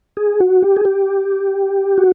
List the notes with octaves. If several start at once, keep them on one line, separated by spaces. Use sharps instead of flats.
G#4
F#4
G4
G#4
G4
F#4